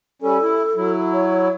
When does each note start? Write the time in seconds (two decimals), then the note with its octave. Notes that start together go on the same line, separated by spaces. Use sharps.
0.22 G3 C#4 A4
0.42 E4
0.76 F#3 E4
1.14 C#5